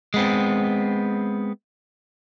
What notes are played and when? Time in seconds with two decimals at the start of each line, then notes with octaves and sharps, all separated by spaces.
0.14 G#3 B3 C4